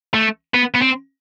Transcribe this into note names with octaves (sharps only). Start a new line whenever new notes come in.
A3
B3
B3
C4